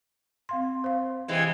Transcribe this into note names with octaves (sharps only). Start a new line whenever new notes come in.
C4 F5 C6
C5 F5
C3 E3 G#3